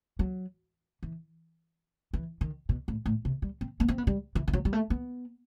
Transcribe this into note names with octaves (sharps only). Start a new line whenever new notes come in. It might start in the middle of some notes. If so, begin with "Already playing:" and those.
F#3
E3
E3
D#3
B2
A2
A2
C3
G3
C4
B3
C4
B3
G3
E3
E3
F#3
G3
A3
B3